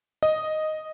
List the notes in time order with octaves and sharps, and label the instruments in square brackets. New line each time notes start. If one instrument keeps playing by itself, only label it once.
[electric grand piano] D#5